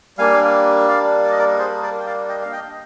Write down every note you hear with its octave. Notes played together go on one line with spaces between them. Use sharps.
G3 A#3 D4 F5 G#5
D5 F5
D5
D#5
A#4 D5
G#4 C5
A#4 D5
G5
D5 F5
D#5 G5
F5
D#5 G5